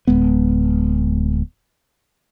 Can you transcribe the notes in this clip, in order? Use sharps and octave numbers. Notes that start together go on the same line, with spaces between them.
D1 G#3 B3